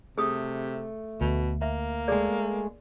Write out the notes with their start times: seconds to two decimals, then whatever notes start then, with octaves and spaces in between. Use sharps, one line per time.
0.18 C3 A3 G#4 D#6
1.21 D2 B2
1.62 A#3 E5
2.08 G#3 A3 G#4 D5